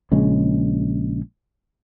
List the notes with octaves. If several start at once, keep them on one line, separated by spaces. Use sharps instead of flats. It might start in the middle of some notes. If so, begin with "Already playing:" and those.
A#1 C#3 G#3